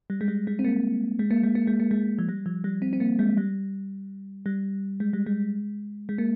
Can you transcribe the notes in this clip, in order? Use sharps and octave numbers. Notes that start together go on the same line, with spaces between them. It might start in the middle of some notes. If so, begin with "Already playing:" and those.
G3
G#3
G3
G#3
C4
A#3
G#3
A#3
G#3
A#3
G#3
A#3
G#3
F3
G3
F3
G3
C4
C4
A#3
G#3
G3
G3
G#3
G3
G#3
G#3
A#3